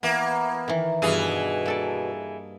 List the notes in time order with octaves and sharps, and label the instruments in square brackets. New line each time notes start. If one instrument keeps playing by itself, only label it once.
[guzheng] E3 [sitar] A#3 [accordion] B3
[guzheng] D#3 E3
[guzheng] G2 A4 F5 [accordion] B2 [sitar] E3 G#4
[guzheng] A#3 A4 D5